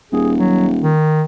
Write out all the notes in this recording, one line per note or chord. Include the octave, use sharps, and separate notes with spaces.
D#1 G#4
F#3
D#3